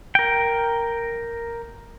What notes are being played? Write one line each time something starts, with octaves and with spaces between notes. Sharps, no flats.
A#4 G5